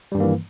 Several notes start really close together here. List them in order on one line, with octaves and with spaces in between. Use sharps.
G3 G2 D#3 A#3 E3